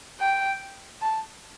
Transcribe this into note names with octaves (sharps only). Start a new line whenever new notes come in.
G5
A5